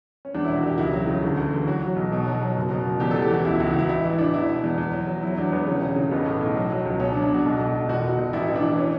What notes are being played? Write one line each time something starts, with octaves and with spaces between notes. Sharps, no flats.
C#4
E2 D4
E4
E1
F#4
E1 G4
C#2 E4
F#3
C#3
D2
D2
E3
F#3 F#4
F#3
B1
B2
F#3
F#3
F#1
B2
F#1
E2 G4
A4
E2
G4
E3 F#4
C#2 E4
E4
C#2
F#4
C#2 E4
A1 E4
E3
A1 D4
E2 E4
B2
E2
E2
F#3
F#3
F#3 E4
E2 D4
E2 B3
C#3 C#4
E1
C#3
B1 B3
A2
B1
F#3
F#3
C#2
B2 C#4
D4
F#3
D4
B2 F#4
B1
B1
B1
E1 F#4
E1
E1
A1 E4
A1
D4
E3
C#4